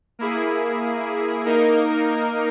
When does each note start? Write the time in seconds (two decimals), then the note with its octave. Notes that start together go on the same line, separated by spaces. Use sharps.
0.19 A#3 E4 G#4
1.46 A#3 D#4 A#4